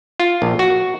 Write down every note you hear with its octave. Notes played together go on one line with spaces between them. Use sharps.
F4
A#1
F#4